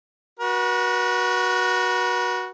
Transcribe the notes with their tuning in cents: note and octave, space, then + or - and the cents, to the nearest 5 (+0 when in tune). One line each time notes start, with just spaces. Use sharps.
F#4 +0 B4 -40